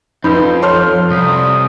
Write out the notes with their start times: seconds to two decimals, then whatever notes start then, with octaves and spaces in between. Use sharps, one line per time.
0.24 F2 D#4 B4 C5 B5
0.62 A4 C5 C#5 C6 F6
1.10 C2 D#6